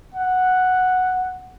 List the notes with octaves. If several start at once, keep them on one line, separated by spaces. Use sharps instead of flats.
F#5